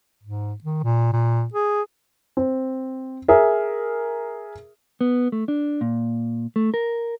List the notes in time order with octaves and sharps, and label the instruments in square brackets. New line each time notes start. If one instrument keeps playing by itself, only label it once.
[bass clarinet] G#2
D#3
A#2
A#2
G#4
[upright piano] C4
G#4 A#4 E5
[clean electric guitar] B3
A3
D4
A#2
A3
A#4